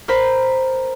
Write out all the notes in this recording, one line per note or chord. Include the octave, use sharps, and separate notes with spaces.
A#4 C5 B5